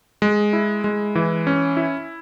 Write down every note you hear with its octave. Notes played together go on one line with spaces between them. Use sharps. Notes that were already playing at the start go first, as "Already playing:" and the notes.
G#3
E4
G#3
E3
C#4
E4